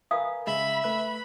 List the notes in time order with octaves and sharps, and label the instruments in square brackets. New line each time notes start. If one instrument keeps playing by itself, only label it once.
[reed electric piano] A#4 B4 G#5 [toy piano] F5 D#6
[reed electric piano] C#3 G#3 [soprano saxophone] E5 [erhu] B5
[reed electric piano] A3 B4 F#6 [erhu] B5